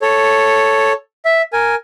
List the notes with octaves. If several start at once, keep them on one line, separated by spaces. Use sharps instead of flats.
A4 C#5
E5
A#4 G#5